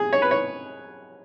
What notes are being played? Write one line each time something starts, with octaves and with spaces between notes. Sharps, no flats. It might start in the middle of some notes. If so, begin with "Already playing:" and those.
Already playing: G#4
C#5
B4
C#5